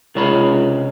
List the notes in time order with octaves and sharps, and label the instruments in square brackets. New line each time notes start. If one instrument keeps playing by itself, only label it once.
[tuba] C#2 [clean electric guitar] C3 C#5 B5